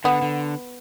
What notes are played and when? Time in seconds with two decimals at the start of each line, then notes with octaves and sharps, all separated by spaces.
0.04 D3 B3
0.22 D3